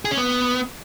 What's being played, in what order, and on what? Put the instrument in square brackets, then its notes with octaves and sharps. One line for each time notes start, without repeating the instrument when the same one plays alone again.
[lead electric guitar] G#4
C#4
B3